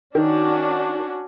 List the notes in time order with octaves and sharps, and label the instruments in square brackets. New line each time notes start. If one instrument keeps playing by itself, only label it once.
[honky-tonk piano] D#3 [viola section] C#4 D4 F#4